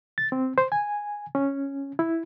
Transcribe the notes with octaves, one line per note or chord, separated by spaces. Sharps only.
A6
C4
C5
G#5
C#4
E4